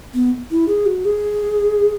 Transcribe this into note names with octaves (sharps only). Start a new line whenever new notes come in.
B3
E4
G#4
F#4
G#4